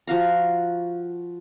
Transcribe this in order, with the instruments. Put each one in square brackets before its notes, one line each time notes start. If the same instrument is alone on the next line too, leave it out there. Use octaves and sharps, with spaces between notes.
[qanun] F3 F#4 F5 A#5